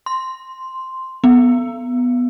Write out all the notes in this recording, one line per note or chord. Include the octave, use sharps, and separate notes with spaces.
C6
B3